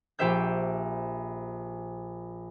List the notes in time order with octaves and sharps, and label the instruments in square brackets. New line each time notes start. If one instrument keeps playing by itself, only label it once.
[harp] A#1 G4 C5 E5 G6